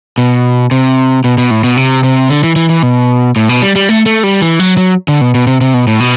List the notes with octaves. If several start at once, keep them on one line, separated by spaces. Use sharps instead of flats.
B2
C3
B2
B2
A2
B2
C3
C3
D3
E3
E3
E3
B2
A2
B2
G3
G3
A3
A3
G3
E3
F#3
F#3
D3
B2
B2
C3
C3
B2
A2
B2